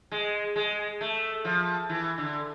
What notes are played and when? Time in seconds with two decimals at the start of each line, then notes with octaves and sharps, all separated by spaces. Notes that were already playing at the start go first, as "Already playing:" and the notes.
0.11 G#3
0.56 G#3
1.01 A3
1.45 F3
1.89 E3
2.18 D3